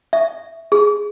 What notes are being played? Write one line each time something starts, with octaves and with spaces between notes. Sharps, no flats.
E5
G#4